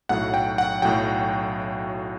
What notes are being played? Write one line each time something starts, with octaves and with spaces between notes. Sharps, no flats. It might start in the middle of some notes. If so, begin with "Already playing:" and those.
B1 A2 F#3 F#5
G5
F#5
B1 A2 F#3 G5